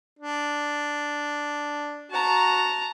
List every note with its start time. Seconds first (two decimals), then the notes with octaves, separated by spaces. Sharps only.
0.19 D4
2.11 F#4 A5 A#5